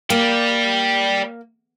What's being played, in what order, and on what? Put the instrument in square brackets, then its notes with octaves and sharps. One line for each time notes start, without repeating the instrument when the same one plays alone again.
[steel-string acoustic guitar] A#3 [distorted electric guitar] D5 G5